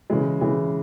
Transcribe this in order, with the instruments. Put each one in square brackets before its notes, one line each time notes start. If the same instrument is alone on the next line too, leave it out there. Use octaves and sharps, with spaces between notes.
[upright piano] C#3 E3 G#3
C#3 E3 G#3